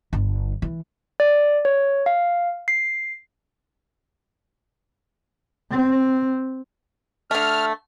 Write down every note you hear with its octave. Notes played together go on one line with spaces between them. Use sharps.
G1 D3
E3
D5
C#5
F5
C7
C4
D3 A3 F6